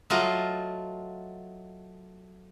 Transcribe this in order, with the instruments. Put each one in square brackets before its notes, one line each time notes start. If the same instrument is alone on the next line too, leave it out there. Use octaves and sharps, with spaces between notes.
[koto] F#3 A3 F4 D#5